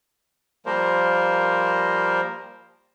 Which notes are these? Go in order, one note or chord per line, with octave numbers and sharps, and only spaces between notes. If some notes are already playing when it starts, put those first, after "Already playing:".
F3 G3 A#3 A#4 C5